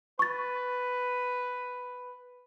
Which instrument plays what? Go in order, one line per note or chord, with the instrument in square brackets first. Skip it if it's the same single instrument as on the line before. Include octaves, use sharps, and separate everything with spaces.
[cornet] B4 [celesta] C#6 A6